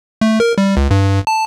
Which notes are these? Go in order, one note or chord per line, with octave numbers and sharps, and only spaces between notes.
A3
A#4
G3
C#2
G2
A5